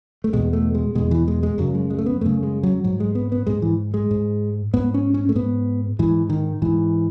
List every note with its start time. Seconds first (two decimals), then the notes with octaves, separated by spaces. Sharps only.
0.24 A3
0.33 E2 B2 G#3
0.53 A3
0.75 G#3
0.95 E2 B2 G#3
1.11 E3
1.28 G#3
1.43 G#3
1.58 F#2 C#3 F#3
1.75 G#3
1.90 G#3
1.98 A3
2.06 B3
2.21 F#2 C#3 A3
2.43 G#3
2.63 F#3
2.84 G#2 F#3
3.00 G#3
3.15 B3
3.32 B3
3.47 G#2 G#3
3.62 E3
3.94 G#3
4.11 G#2
4.73 G#2 B3
4.94 C#4
5.14 C#4
5.29 A3
5.35 G#2 B3
5.99 G#2 E3
6.29 D#3
6.62 G#2 E3